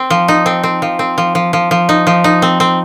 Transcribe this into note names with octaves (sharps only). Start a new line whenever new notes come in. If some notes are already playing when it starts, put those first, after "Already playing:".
Already playing: C4
F3
D#4
C4
C4
F3
C4
F3
F3
F3
F3
D#4
F3
D#4
C4
C4